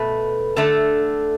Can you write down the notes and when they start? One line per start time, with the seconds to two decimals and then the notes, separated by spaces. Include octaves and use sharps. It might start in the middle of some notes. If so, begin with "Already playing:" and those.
Already playing: B2 A3 B4
0.57 D3 A3 A4